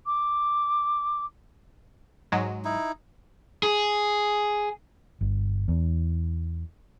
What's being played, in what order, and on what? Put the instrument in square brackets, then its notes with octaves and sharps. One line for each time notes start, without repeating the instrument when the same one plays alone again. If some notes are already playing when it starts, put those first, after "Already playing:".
[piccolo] D6
[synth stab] G#2 F#3 G#3
[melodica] D#4 E4
[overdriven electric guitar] G#4
[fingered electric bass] G1
E2